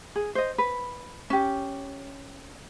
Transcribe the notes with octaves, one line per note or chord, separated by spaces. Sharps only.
G#4
C5 D#5
B4
C#4 G4